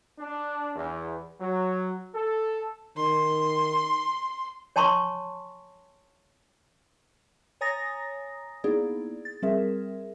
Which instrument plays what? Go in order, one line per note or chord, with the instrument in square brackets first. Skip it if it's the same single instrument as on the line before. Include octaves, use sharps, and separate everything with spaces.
[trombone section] D4
E2
F#3
A4
[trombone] D#3 [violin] C6
[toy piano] C#5 G#5 A5 C6 C#6
[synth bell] C#5 G#5 A#5 D#6 A6 A#6
A#3 B3 D#4 E4 G#4 D5
A6
G3 C4 G#4 A#4 E5